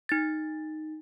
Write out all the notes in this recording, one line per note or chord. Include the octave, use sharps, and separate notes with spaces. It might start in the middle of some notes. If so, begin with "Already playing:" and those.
D#4 A6